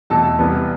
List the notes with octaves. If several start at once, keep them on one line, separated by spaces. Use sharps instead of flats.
E2 B2 A3 A4 A5
C2 C3 E3 B3